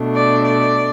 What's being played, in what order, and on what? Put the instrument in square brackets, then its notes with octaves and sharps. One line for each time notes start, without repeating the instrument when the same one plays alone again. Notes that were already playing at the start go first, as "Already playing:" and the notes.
Already playing: [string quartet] B2 A3 D4
D5
D5